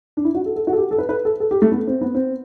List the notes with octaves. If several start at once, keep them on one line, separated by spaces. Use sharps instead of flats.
D4
E4
F#4
A4
A4
F#4
A4
G4
A4
B4
B4
A4
A4
G4
A3
B3
C4
B3
C4